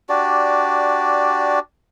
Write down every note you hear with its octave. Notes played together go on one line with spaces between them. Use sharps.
D4 F#4 G4 D5